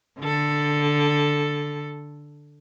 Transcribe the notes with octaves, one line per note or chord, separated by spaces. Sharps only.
D3 A4